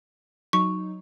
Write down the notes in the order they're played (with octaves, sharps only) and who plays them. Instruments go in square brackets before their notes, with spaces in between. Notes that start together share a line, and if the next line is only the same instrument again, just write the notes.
[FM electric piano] F#3 D#4 [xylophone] C#6